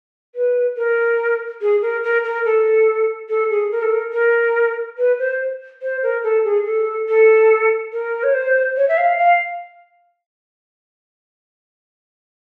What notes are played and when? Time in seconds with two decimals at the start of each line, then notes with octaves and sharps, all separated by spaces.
0.35 B4
0.77 A#4
1.62 G#4
1.82 A#4
2.03 A#4
2.24 A#4
2.45 A4
3.29 A4
3.50 G#4
3.72 A#4
3.83 A4
3.92 A#4
4.13 A#4
4.98 B4
5.19 C5
5.82 C5
6.03 A#4
6.24 A4
6.45 G#4
6.66 A4
7.09 A4
7.93 A#4
8.23 C#5
8.34 C5
8.77 C#5
8.88 E5
8.97 F5
9.18 F5